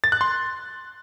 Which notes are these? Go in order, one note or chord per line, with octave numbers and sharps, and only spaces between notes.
A6
F#6
C6